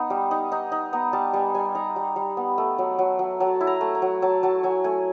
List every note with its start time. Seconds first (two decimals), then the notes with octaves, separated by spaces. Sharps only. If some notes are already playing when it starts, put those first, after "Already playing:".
Already playing: B3 D#4
0.10 G3
0.31 D#4
0.52 D#4
0.72 D#4
0.93 B3 A#5
1.13 G3 A5
1.33 G3 G#5
1.55 G3 G#5
1.75 D#4 A#5
1.96 G3
2.16 G3
2.37 B3
2.58 A3
2.78 F#3
2.99 F#3
3.19 F#3
3.40 F#3 A5
3.61 E4
3.67 A#5
3.81 A3
3.95 A#5
4.02 F#3
4.22 F#3 A5
4.43 F#3 A5
4.63 F#3 G#5
4.84 A3 G#5